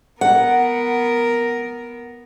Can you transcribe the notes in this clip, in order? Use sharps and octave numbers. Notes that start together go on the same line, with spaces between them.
B3 A#4 F#5